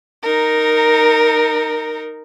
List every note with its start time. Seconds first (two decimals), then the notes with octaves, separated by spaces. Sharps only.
0.22 D#4 A#4